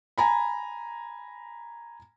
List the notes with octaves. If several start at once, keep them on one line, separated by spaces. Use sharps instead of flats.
G#5 A#5 B5